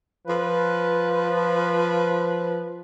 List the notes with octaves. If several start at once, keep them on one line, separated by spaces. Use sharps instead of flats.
F3 B4